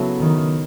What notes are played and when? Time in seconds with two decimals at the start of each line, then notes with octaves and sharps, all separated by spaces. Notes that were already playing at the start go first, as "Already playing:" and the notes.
Already playing: C#3 F#3 B3 E4 A4
0.20 D#3